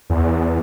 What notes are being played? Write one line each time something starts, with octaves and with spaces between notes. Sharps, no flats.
E2